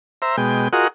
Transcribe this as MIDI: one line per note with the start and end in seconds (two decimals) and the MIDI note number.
0.22 0.36 72
0.22 0.36 76
0.22 0.36 82
0.37 0.68 47
0.37 0.68 56
0.37 0.68 79
0.73 0.88 65
0.73 0.88 66
0.73 0.88 68
0.73 0.88 70
0.73 0.88 75
0.73 0.88 78